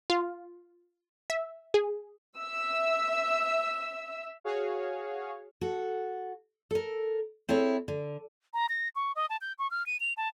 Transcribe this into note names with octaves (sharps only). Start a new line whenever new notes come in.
F4
E5
G#4
E5 E6
F#4 G#4 C#5 F5
F#4 A4
A4 A#4
C4 E4 G#4 A4 C#5
D3
A#5
A#6
C#6
D#5
A5
G6
C#6
F6
D#7
F7
A5